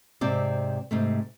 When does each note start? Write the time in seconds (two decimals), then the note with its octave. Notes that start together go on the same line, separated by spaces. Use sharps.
0.21 G#2 C3 C4 C5 D5
0.91 G#2 C3 A3